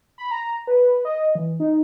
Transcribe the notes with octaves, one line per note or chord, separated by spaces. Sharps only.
B5
A#5
B4
D#5
E3
D#4